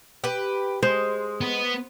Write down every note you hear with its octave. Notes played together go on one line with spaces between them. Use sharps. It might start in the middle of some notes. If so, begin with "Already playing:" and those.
G4 B4
G#3 C5
B3